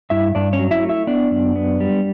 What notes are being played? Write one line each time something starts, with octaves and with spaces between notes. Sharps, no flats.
G2 E4 E5
G2 D4 D5
C#4 C#5
F#3
E4 E5
A3
E4 E5
B3 D4 D5
F#2
B3
G3